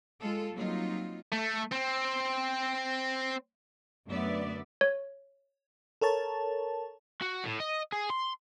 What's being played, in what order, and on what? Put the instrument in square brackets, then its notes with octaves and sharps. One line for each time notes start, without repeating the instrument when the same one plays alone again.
[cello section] G#3 F4 A4
F#3 G3 A#3 C4 D#4 F4
[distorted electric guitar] A3
C4
[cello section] F#2 D3 A3 B3 D5 E5
[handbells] C#5
[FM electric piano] A4 A#4 C#5 A5
[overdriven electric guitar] F#4
A2
D#5
G#4
C6